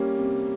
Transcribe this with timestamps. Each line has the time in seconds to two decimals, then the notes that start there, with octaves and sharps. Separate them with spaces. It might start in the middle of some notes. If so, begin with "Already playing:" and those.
Already playing: G3 A#3 C#4
0.19 C3